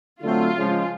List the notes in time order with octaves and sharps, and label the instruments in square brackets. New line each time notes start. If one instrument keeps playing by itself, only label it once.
[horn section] D3 F#3 A3 C4 [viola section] F4
[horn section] C#3 F3 G#3